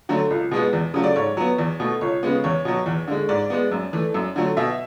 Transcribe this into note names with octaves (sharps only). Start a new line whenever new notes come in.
D3 F#3 A3
C#2
B2 G#3 B3
E2
C#3 F#3 A3
D5
G#2 C#5
F#3 B3
E2
B2 A3
C#2 C#5
C#3 G#3 B3
E2 C#5
B2 F#3
E2
D3 G#3
G#2 D5
G#3 B3
F#2
E3 A3
F#2
D3 F#3 A3
B2 E5